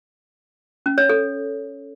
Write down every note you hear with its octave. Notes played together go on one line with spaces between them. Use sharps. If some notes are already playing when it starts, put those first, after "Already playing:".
C#4
C#5
A4